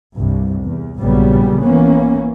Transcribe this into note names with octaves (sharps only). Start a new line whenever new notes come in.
C2 G2
E2
A#1 G2 C#3 F#3 G3 B3
E3 A#3 B3 C#4